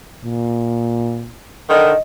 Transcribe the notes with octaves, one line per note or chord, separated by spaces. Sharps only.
A#2
D3 D#3 D#5